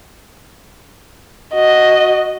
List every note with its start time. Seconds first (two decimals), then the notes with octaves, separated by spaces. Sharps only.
1.54 F#4 D#5